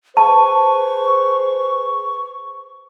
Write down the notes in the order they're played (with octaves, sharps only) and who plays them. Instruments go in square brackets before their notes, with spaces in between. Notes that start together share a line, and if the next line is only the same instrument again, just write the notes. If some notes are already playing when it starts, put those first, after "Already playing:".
[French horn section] G#4 B4 C5 [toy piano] A5 [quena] C#6